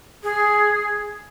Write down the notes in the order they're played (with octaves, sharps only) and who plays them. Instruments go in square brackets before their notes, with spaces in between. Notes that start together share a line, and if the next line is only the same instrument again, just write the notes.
[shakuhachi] G#4